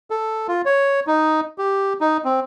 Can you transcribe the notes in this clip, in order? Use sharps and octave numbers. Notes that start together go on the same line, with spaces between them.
A4
F4
C#5
D#4
G4
D#4
C4